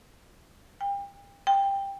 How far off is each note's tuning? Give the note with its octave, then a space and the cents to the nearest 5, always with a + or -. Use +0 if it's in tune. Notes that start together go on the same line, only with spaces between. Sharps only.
G5 +35
G5 +10